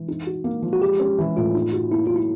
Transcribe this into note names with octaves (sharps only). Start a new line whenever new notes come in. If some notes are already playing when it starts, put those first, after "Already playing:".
Already playing: E3
D#4
F#4
A#3
F3
F#4
G#3 G4
C#4
E3
A2 F4
D#4
F#4
A#3 E4
F#3 F4
E4